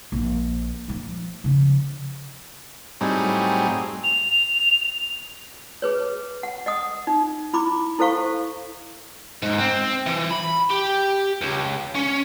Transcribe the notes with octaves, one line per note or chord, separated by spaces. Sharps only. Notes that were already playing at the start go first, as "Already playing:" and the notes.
A#1
A#2 F3
C#3 F3
A2 F#3 G3 C4 D#4 G#4
F7
G#4 B4 C#5
F#5
D#5 F#5 D#6
D#4
E4 B5 D6
E4 A4 C5 F5 C#6
G#2
C4
E3
B5
G4
C#2
C#4